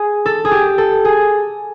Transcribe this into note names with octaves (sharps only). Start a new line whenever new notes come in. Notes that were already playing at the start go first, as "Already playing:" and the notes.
Already playing: G#4
A4
G#4
G4
A4
G#4